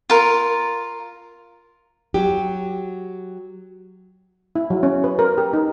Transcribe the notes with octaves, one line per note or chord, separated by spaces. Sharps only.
F4 A#4
F#3 G4
E4
F#3
C#4
B4
A#4
G4
D#4